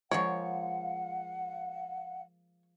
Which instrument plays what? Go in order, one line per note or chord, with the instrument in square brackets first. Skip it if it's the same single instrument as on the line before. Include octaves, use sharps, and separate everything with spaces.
[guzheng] F3 G#3 A#3 [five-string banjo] C#5 [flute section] F5 F#5